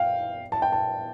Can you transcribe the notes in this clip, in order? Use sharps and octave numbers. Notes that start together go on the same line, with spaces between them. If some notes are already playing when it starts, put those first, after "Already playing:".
Already playing: F5 G5
A5
G5
A5